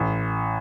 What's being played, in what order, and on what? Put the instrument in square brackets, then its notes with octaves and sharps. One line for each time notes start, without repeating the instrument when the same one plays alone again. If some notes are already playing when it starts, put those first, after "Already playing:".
Already playing: [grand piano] A1